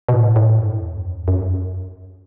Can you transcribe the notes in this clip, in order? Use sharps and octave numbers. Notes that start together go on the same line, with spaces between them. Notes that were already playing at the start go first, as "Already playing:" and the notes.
B2
A2
A2
G2
E2
F#2
F#2